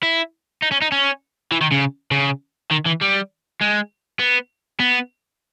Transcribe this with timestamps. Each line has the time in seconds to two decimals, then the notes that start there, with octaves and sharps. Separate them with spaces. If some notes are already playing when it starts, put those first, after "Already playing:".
0.03 E4
0.62 D#4
0.71 C#4
0.81 D#4
0.92 C#4
1.52 E3
1.61 D#3
1.72 C#3
2.11 C#3
2.71 D#3
2.86 E3
3.01 G3
3.61 G#3
4.19 B3
4.80 B3